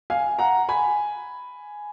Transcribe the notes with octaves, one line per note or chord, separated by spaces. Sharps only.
F5 G#5
F#5 A#5
G#5 B5